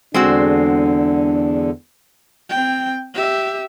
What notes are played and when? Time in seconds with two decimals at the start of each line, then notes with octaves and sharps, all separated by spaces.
0.14 E2 D3 G#3 C4 D4 F#4
2.50 C4 G5
3.14 G4 E5